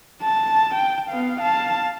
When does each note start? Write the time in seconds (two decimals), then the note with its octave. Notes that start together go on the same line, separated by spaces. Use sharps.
0.23 A5
0.75 G5
1.10 B3 F5
1.41 F5 A5